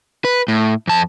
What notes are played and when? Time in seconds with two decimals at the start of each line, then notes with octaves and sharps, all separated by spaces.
0.25 B4
0.48 A2
0.87 F2 A5